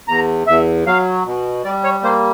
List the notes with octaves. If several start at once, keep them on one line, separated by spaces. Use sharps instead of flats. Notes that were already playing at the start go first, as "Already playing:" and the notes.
E2 A#5
E2 E5
F#3 F5
B2
G3 D5
C#5
A#3 C5